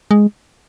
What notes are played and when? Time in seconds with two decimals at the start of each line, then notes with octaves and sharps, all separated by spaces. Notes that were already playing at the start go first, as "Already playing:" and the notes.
0.11 G#3